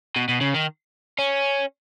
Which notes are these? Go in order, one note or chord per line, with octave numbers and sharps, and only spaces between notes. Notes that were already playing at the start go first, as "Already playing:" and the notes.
B2
B2
C#3
D#3
C#4